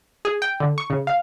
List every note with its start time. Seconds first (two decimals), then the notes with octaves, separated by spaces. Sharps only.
0.25 G#4
0.42 G5
0.60 D3
0.78 C#6
0.90 C#3
1.07 F5